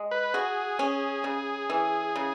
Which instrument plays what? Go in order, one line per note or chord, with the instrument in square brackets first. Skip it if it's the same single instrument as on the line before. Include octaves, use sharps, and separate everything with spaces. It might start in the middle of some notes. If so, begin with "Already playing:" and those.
Already playing: [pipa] G#3
[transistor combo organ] B4
[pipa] F#4 [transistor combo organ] G#4
[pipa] C#4
C#3
E3
C#3